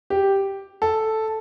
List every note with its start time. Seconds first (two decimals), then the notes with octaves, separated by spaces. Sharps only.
0.10 G4
0.82 A4